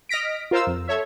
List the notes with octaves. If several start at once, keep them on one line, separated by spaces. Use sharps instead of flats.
D#5 F6 A#6 B6 D7
F4 A#4 C5 F5 E6
F2
A4 C#5 E5